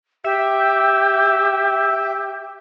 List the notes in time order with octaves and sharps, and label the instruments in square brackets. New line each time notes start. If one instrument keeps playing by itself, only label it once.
[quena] G4 [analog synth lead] E5